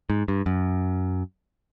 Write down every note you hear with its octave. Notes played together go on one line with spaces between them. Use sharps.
G#2
G2
F#2